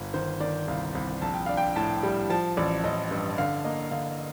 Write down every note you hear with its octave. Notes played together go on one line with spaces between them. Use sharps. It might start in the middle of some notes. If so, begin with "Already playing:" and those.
Already playing: G1
D#3 C5
D#3 D5
C2 F5
C2
A#1 A5
G5
D4 F5
G5
A2 A5
G3
F3 A5
A1 D5
A1 D#5
G2
D3 F5
A#3 D#5
D3 F5